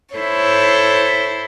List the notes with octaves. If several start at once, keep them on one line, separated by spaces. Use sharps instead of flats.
E4 A4 C5 C#5